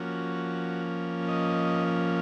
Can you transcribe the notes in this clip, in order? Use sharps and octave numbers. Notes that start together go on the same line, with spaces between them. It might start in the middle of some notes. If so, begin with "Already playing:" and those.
Already playing: F3 A#3 C#4 F#4
D#5